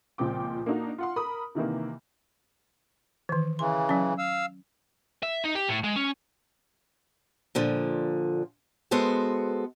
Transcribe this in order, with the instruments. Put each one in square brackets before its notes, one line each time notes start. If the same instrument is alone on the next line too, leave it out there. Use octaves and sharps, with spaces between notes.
[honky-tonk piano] C#2 A#2 F3 C4 G5 D6
A#3 D4 D#4 F#4
F4 F#5 C6
A#4 B5 D#6
C3 D#3 E3 A#3
[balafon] D#3 E3
[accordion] C#3 E3 [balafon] C6
[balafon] F#3 C#4
[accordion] F5 E6
[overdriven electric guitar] E5
D#4
G4
A2
G#3
C#4
[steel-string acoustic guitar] A#2 D3 F3
G#3 B3 F#4 A4 C5